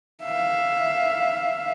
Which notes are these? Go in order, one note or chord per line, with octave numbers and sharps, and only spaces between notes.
E5 F5